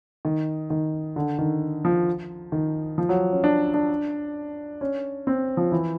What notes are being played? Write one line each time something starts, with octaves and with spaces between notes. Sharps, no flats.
D#3
D#3
D3
D#3
F3
D#3
F3
F#3
C#4
D4
D4
C#4
C4
F3
E3